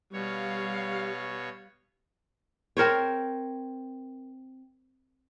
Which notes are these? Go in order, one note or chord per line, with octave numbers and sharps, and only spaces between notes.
B2 G3 C#5 F5
C4 A#4 C5 C#5